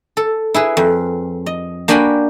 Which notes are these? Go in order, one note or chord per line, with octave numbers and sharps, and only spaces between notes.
A4
E4 G#4 B4
F2
D#5
A#3 D4 F#4 G5 G#5 B5